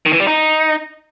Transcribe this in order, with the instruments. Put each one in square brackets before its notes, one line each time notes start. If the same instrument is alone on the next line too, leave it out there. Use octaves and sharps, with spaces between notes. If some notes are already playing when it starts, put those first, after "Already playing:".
[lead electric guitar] D#3
E3
G3
D#4